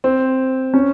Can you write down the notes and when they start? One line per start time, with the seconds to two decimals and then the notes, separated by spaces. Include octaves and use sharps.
0.04 C4
0.74 C#4